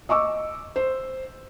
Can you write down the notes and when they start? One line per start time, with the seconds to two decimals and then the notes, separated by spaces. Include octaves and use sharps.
0.09 D#5 C#6 D6 E6
0.76 C5